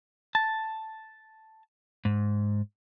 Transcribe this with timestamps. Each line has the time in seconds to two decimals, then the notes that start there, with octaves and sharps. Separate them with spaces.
0.35 A5
2.05 G#2